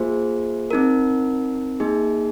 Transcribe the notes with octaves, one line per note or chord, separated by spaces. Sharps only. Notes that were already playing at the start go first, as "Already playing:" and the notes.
Already playing: A#3 F4 G#4 C5
C4 D#4 A#4
A#3 D#4 G#4